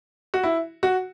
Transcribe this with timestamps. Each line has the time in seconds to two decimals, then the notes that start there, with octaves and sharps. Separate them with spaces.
0.34 F#4
0.43 E4
0.83 F#4